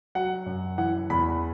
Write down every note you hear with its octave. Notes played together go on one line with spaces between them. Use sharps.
F#3 F#5
F#2
E3 F#5
E2 B5